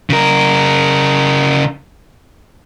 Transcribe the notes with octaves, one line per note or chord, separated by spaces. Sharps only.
C#3 A#4